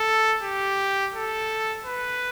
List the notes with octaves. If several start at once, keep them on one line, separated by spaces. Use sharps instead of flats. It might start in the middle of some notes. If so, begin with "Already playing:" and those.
Already playing: A4
G4
A4
B4